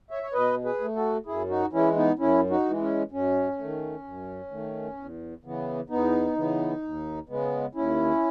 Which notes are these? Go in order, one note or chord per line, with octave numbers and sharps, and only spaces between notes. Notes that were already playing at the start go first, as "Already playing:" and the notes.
C#5 E5
C#5
B2 B4 D#5
G#4 B4
A3
F#4 A4
F#2 E4 G#4
D#4 F#4
E3 G#3 C#4 E4
B3 D#4
F#2 C#4 E4
D#4 F#4
E3 G#3
C#4
F#2 C#4
D#3 A3
F#2
D#3 A3
E2
C#3 E3 B3
E2 B3 D#4
C#3 E3 B3
D#2
C#3 G#3 B3
D#2 C#4 E4